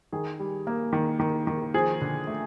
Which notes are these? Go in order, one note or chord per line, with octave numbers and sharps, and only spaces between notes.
D#3 G#4
G3
A#3
D#3
D#3
D#3
F3 G#4
D3
A3